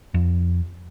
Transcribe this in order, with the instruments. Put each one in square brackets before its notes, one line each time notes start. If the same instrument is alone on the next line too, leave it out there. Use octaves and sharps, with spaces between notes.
[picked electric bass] F2